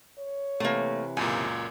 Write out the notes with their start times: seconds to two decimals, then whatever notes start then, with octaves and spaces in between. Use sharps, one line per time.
0.19 C#5
0.60 C3 E3 A3 A#3
1.17 C#2 F#2 A#2 G#5